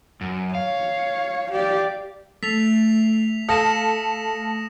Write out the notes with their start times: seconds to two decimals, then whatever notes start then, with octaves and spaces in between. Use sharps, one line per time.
0.21 F#2
0.55 C#5 F5
1.52 G4 D5
2.43 A3 B6 C7 F7
3.49 A4 F5 D#6 A#6 E7